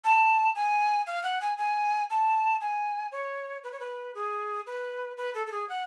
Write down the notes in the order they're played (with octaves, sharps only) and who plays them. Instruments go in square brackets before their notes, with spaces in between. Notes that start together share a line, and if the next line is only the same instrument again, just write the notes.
[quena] A5
G#5
F5
F#5
G#5
G#5
A5
G#5
C#5
B4
C#5
B4
G#4
B4
B4
A4
A4
G#4
F#5